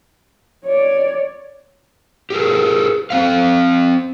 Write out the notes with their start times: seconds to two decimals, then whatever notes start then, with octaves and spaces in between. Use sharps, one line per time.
0.65 C#5 D5
2.30 G4 G#4 A#4
3.10 C4 C5 F5